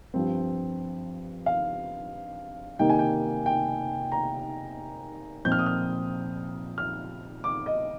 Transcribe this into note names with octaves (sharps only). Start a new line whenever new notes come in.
G2 F3 C4
F5
C3 D#3 A#3 D#4 G5
G#5
G5
G5
A#5
A#2 F3 C4 D#4 G6
F6
D#6
F6
F6
D6
D#5